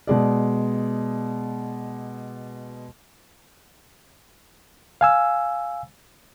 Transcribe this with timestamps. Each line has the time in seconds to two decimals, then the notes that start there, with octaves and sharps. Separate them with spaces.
0.07 B2 G#3 D5
5.01 F5 G#5 E6